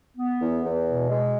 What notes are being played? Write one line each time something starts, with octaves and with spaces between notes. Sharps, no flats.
B3
E2
E2
B2
G#3